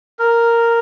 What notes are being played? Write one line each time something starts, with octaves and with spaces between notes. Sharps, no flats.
A#4